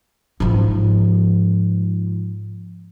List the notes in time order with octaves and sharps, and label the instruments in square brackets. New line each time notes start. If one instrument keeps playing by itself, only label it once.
[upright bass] G#2 F3